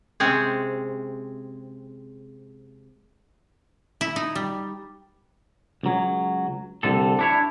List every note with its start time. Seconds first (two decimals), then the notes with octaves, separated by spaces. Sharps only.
0.20 C3 G#3 C4 C#4 G#4
4.01 E4
4.16 D#4
4.35 G3
5.83 C#2 F#3
6.83 C2 D3 A4
7.19 D4 E4 C#5